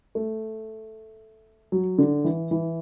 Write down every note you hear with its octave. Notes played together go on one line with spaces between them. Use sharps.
A3
F#3
D3
E3
E3